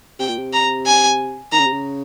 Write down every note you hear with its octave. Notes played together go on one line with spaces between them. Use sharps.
C3 G5
A#2
C3
A#5
G#5
D#3 A#5
C#3
C3
C#3